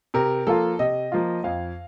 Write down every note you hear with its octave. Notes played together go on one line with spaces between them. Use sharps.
C3 A#4
F3 A#3 F4 A4
C3 D#5
F3 A#3 F4
F2 F5